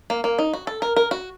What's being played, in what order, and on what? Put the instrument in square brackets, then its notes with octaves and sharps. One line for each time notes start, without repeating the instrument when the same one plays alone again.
[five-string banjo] A#3
A#3
D#4
F#4
A4
A#4
A#4
F#4